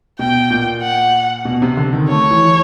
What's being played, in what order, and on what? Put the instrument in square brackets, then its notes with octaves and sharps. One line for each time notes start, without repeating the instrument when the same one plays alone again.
[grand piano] B2 [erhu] G5
[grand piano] A#2
[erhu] F#5
[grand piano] B2
C3
D3
D#3
[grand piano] A3 [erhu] C#5
[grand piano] E3
E3